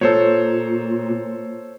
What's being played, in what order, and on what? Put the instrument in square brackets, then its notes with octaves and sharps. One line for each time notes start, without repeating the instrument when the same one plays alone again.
[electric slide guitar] A#2 [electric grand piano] A4 C5 C#5